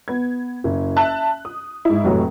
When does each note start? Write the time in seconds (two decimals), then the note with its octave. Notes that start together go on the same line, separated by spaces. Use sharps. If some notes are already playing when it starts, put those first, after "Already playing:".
0.08 B3 G#6
0.64 F#1
0.96 E5 A5 F#6
1.45 D#6
1.85 G#2 E4
2.04 F1 A2 F#3